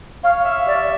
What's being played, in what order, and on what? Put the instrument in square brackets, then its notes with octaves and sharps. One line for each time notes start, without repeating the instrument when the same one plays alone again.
[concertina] C#5 [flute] F5
[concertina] E5 [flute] F5
[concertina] G4 [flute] D5